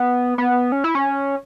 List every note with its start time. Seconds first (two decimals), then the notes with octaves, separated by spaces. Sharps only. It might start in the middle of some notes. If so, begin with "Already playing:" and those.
Already playing: B3
0.38 B3
0.72 C#4
0.84 E4
0.95 C#4